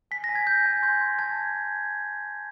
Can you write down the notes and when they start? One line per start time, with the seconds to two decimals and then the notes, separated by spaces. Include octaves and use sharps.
0.11 G#5 B6
0.24 A#6
0.29 G#5
0.35 G#6
0.47 G#5 G6
0.66 G#5
0.82 C6 G6
1.01 C6
1.19 A5 G#6